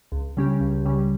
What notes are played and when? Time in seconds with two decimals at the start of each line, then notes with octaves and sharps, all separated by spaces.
0.12 C#2
0.37 C#3 G3 C#4 G4
0.60 C#2
0.85 C#3 G3 C#4 G4